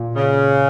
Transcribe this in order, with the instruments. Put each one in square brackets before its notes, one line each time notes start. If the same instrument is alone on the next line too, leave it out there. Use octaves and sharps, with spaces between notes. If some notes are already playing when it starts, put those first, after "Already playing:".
Already playing: [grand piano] A#2
[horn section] C#3